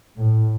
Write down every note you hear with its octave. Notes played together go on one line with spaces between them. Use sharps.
A2